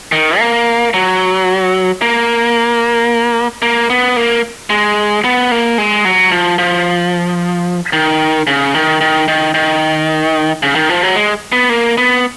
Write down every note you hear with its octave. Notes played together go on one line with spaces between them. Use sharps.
D#3
A#3
F#3
A#3
A#3
B3
A#3
G#3
B3
A#3
G#3
F#3
F3
F3
D#3
C#3
D#3
D#3
D#3
D#3
C#3
D#3
F3
F#3
G#3
B3
A#3
B3